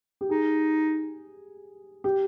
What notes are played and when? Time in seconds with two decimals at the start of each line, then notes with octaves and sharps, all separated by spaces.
0.21 G4
0.29 D#4 G#4
2.04 G4